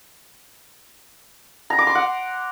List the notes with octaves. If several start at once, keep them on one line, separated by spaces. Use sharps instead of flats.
A#5
D6
C6
F#5